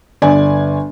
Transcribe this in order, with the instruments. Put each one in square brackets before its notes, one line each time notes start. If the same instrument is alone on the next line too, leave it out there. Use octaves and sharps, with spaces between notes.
[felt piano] G1 D5 G#5